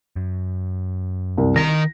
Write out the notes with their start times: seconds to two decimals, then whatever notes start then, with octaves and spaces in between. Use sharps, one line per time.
0.16 F#2
1.38 C2
1.56 D#3 A#5 A#6